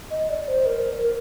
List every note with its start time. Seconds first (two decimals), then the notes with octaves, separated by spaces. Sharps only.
0.11 D#5
0.29 D5
0.48 C5
0.66 A#4
1.02 A#4